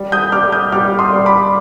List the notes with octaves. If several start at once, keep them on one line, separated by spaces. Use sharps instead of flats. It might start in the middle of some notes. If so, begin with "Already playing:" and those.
Already playing: G3
D#6 G6
G3 D6 F6
D#6 G6
G3 D6 F6
C6 D#6
G3
B5 D6